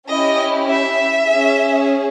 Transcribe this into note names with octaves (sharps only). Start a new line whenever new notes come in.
C#4 E4 G4 D#5
E5
C#4 G#4